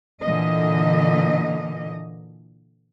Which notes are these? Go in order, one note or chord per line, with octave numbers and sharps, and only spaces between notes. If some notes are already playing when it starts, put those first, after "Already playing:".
A#2 D3 E3 D#5